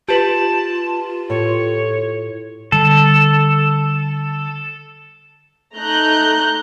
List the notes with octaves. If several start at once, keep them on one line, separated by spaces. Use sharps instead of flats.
F4 G4 B4 A5 F#7
A2 C#5
D3 G3 A4
A3 D#4 A#5 F#6 G6